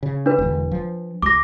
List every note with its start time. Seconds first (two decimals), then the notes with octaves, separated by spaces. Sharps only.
0.03 C#3
0.26 D4 B4
0.39 E1 D3
0.71 F3
1.22 C#2 D6 A#6